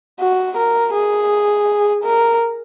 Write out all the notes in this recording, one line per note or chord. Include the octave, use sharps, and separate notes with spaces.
F#4
A#4
G#4
A#4